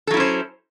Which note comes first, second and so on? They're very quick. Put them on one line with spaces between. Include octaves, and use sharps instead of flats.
A4 F#3 E4 C#4 C5